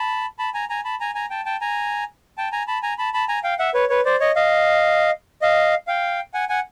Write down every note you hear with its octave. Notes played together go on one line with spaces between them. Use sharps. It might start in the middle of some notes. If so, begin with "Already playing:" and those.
Already playing: A5 B5
A5 B5
G#5 A#5
G#5 A#5
A5 B5
G#5 A#5
G#5 A#5
G5 A5
G5 A5
G#5 A#5
G5 A5
G#5 A#5
A5 B5
G#5 A#5
A5 B5
A5 B5
G#5 A#5
F5 G5
E5 F#5
B4 C#5
B4 C#5
C5 D5
C#5 D#5
D#5 F5
D#5 F5
F5 G5
F#5 G#5
F#5 G#5